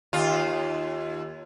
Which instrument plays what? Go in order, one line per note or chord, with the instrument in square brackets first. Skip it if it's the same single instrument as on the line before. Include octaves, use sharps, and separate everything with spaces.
[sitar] D#2 F4